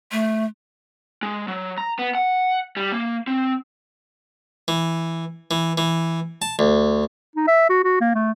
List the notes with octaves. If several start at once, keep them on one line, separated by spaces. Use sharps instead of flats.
A3
G#3
F#3
A#5
B3
F#5
G3
A#3
C4
E3
E3
E3
A5
D2
D#4
E5
F#4
F#4
A#3
A3